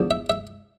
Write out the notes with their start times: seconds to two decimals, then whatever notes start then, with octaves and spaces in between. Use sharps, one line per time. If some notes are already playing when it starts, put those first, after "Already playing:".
Already playing: E2 D3 F3
0.11 E5
0.30 E5